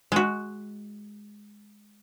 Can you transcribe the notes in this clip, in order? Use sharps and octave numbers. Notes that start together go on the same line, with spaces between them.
G#3 F#4